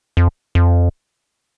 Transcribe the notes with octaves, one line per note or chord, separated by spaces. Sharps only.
F2
F2